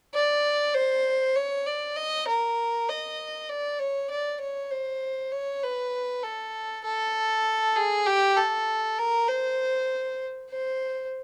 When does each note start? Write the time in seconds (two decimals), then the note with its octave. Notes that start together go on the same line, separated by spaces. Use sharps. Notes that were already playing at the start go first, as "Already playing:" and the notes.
0.14 D5
0.74 C5
1.36 C#5
1.66 D5
1.96 D#5
2.27 A#4
2.88 D#5
3.49 D5
3.79 C#5
4.10 D5
4.40 C#5
4.71 C5
5.32 C#5
5.63 B4
6.23 A4
6.84 A4
7.76 G#4
8.06 G4
8.36 A4
8.98 A#4
9.28 C5
10.50 C5